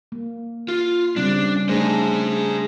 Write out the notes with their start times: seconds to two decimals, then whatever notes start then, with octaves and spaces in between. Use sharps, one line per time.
0.12 A#3
0.68 F4
1.16 C#3 G3 C4 D4
1.69 A3 D4 G#4 C5